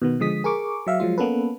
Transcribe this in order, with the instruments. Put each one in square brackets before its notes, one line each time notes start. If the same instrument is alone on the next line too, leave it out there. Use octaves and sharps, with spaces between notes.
[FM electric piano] B2 D#3 B3
D3 F3 G#3 D#6 B6
G#4 A#4 C#6 D6
F#3 E5 F5
F3 F#3 G#3 F4
A#3 B3 C#4 A4 B4